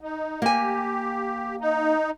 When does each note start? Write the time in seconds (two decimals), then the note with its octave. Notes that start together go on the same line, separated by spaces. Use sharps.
0.01 D#4
0.42 A#3 G4 G#5
1.61 D#4